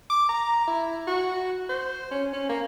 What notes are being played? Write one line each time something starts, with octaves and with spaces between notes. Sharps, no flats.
D6
A#5
E4
F#4
C5
C#4
C#4
A#3